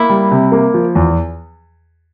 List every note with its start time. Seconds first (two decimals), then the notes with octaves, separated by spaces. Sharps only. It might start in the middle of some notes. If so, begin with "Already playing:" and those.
Already playing: A#3 E4
0.09 G3
0.31 C3
0.52 A#3
0.74 F3
0.95 E2